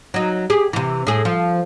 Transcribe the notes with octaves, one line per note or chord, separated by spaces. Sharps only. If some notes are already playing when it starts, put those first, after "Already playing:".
F#3 D#4
G4 G#4
C3 E3
A2 G#4
F3